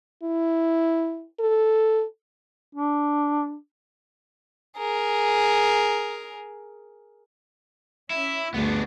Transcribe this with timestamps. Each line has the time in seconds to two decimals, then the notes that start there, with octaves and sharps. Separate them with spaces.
0.23 E4
1.40 A4
2.75 D4
4.77 G#4 A#4
8.10 C#4 E4 E5
8.54 D2 G2 B3 D4 G#4